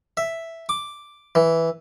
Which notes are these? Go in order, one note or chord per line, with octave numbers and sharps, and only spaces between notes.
E5
D6
E3